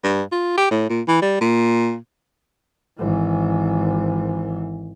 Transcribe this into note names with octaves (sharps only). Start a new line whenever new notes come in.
G2
F4
G4
A2
A#2
E3
G3
A#2
G#1 E3